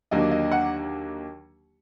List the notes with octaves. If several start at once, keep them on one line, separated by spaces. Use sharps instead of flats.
D#2 D3 F#3 A#3 D4 D#5
D#5
F#5